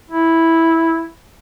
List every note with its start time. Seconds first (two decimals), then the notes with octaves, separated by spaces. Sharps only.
0.10 E4